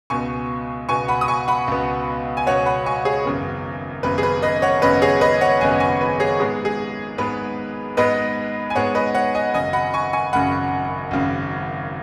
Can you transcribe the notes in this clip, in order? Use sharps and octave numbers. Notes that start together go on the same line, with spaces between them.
C#2 B2 B3 G#5 C#6
C#2 B2 B3 G#5 C#6
F#5 B5
D#6
G#5 C#6
F#5 B5
C#2 B2 B3
G#5
C#2 B2 B3 C#5 F#5
F#5 B5
G#5 C#6
G#4 C#5
G#1 F#2 C#3 B3
G#1 F#2 C#3 B3 B4
G#4
B4
B4 D#5
C#5 F#5
G#1 F#2 C#3 B3 B4 D#5
G#4 C#5
B4 D#5
C#5 F#5
G#1 F#2 C#3 B3 D#5 G#5
G#5 C#6
B4
G#4 C#5
G#2 G#3 B3 G#4
G#4
G#2 G#3 B3 B4
G#2 G#3 B3 B4 D#5
G#5
G#2 G#3 B3 C#5 F#5
B4 D#5
C#5 F#5
D#5 G#5
G#1 F#2 C#3 D#5 G#5
F#5 B5
G#5 C#6
G#5 C#6
G#1 F#2 C#3 F#5 B5
G#1 F#2 C#3